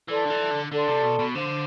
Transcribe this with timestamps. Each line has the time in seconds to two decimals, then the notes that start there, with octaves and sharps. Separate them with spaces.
0.08 E3 A4 D5 A5 C6
0.25 D3
0.30 E3
0.51 D3
0.72 D3 A4 D5 A5 C6
0.88 C3
1.03 B2
1.19 B2
1.35 D3 C5 F5 C6